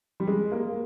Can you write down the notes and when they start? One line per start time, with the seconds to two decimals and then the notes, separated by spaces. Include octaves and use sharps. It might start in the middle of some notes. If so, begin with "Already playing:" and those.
0.20 G3
0.27 G#3
0.52 A#3